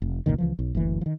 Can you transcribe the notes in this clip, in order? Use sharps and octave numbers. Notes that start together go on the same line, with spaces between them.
F1
F1 C#2 A#2 D#3
C#2 E3 F3
B1
F#1 D2 E3
D#3 F3